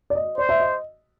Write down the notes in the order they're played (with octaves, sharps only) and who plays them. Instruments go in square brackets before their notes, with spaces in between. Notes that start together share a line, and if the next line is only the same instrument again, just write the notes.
[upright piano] D5
D#5
[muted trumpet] C5 [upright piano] D5
[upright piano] E5
D#5